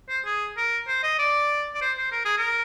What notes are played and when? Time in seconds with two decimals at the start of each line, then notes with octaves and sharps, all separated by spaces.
0.09 C5
0.25 G#4
0.57 A#4
0.88 C5
1.03 D#5
1.19 D5
1.74 D5
1.81 C5
1.98 C5
2.12 A#4
2.25 G#4
2.38 A#4